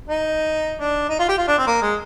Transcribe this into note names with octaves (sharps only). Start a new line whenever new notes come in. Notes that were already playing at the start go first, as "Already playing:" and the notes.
D#4
D4
D#4
F4
G4
F4
D4
C4
A#3
G#3